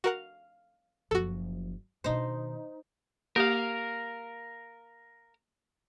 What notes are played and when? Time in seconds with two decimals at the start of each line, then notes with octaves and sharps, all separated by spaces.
0.04 F#4 A#4 F5 F#5
1.11 F#1 F3 F#4 A4
2.04 B2 D#3 D#4 C5
3.36 A#3 G4 A#4 F5